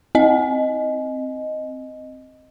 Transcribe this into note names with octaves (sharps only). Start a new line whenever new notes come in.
C4 D#5